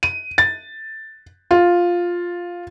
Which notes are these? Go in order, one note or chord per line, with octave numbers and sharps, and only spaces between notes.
D#7
A6
F4